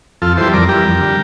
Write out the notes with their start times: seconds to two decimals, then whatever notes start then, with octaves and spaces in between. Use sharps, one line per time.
0.22 F2 F4 A4
0.37 E3 G3 A4 C5
0.53 F2 A#4 D5
0.69 E3 G3 G4 A#4
0.85 F2
1.00 D3 G3